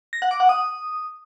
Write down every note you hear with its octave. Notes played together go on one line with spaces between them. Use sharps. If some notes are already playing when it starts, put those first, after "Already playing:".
A#6
F#5
D6
F#5
D#6